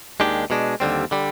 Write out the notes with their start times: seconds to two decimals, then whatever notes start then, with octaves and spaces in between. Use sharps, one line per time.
0.20 D#2 D#3 G#3 D4 G4
0.50 B2 G#3 D4
0.80 D#2 D3 G3 C4
1.11 D3 G3